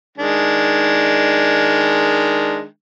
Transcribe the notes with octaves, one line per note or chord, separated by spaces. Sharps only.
D#3 G#3 D4